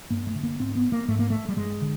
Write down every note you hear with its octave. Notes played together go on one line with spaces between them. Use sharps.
G2 A#3
A3
D3
A#3
G#2 C4
B3
A#3
G#2 A3
A#3
A3
G3
G2 G#3
D3